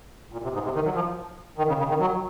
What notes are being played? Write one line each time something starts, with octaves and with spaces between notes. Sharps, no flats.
A#2
C3
G#2
C3
D#3
F#3
F3
D#3
C#3
C#3
D#3
F#3